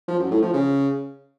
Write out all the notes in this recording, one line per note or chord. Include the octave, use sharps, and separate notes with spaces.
F3
F#2
A2
F3
C#3